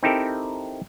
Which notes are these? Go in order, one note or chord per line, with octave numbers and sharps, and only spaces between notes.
C4 D#4 E4 G4 A4 A#4